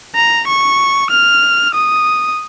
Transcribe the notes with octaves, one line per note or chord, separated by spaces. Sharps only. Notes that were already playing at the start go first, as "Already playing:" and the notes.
A#5
C#6
F6
D#6